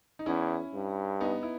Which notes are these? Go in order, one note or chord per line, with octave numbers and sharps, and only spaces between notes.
D#4
E2 C#4 E4
G2
B3 D#4
E4